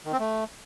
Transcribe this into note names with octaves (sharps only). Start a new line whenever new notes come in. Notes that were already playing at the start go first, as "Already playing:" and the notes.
D#3
C4
A3